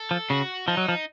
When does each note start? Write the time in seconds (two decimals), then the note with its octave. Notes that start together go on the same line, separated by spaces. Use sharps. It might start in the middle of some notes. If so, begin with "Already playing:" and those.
Already playing: A4
0.11 F3
0.29 C#3 F#4
0.67 F3 D#4
0.77 F#3
0.88 F3